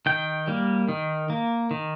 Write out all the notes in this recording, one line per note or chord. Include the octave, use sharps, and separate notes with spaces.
D#3 G5
G3 A#3
D#3
A#3
D#3